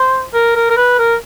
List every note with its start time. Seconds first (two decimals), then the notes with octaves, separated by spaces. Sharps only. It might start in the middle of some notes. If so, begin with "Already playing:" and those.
Already playing: C5
0.34 A#4
0.55 A#4
0.70 A#4
0.77 B4
0.99 A#4